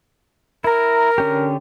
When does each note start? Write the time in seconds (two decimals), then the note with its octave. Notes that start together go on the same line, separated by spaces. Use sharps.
0.64 E4 A#4 A#5
1.18 D3 C#4 G4